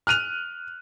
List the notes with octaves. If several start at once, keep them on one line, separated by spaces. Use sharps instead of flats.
F6 F#6 D#7 F7